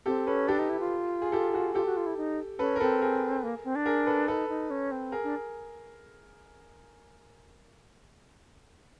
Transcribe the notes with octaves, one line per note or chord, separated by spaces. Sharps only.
C4 G4 A4
C#4 A4 B4
D4 G4 A4
D#4
E4
F4
G#4
G4 A4
F#4 G#4
F4 G4 A4
F#4
F4
E4
D#4
C#4 A4 B4
A#4
C4 A4 B4
G#4 A#4
A#3
C4
D4
G#4 A#4
A4 B4
D#4 A4 B4
D#4
C#4
C4
G#4 A#4
D4